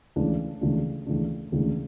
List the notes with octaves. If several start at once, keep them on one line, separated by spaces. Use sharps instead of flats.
C#2 C#3 E3 A3 D4
C#2 C#3 E3 A3 D4
C#2 C#3 E3 A3 D4
C#2 C#3 E3 A3 D4